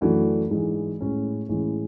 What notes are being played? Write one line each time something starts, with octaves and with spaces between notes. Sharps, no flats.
F#2 E3 A3 D4 F#4
G#2 E3 G#3
A2 G#3 C#4
A2 E3 G#3 C#4